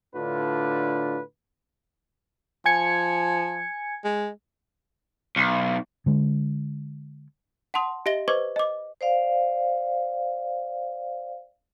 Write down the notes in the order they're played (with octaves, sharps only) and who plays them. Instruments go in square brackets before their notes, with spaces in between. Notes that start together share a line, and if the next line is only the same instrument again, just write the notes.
[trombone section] A2 D3 D4 F4 B4
[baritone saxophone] F3 [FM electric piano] G#5 G#6 C#7
[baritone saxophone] G#3
[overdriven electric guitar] B1
[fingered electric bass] D3 G#3
[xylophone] F#5 A5 C6 D#6
G4 D#5 E5 A#6 G7
B4 C5 D#5 C#6 D6 G#6
D#5 D6
[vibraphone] C5 D5 F5